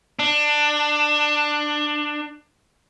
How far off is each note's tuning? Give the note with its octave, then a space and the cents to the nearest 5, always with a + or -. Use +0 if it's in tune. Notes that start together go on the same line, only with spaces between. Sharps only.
D4 +15